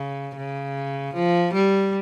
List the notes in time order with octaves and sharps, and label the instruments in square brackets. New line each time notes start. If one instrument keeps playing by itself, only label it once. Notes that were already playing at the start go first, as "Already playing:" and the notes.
Already playing: [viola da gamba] C#3
C#3
F3
G3